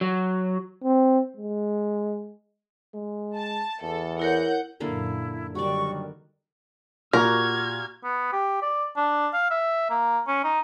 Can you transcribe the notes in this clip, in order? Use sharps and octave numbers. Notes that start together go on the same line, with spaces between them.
F#3
C4
G#3
G#3
A5
E2 A4
E4 A#4 C#5 F#5 G6
F#2 A#2 D3 A#3 E4 F5
D3 D#3 F#3 G3 F#4 D5 C#6
A#2 F#4 G4 A#4 A#5 F6 G#6
B3
G4
D5
D4
F5
E5
A#3
C#4
D#4